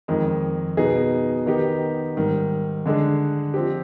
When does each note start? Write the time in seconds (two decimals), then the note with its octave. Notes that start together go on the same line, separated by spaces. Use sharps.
0.08 F2 D#3 G#3
0.77 B2 B3 D#4 G#4
1.46 D#3 B3 D#4 G4
2.16 G#2 D#3 G3
2.86 D3 G#3 D4 G#4
3.54 F3 C4 G4